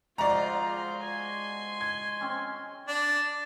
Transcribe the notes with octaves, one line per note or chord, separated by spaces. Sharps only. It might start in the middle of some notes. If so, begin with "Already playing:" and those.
F3 G#3 F4 F#4 C5 D5 A#5
G#5 C6
G#6
C4 C#4
D4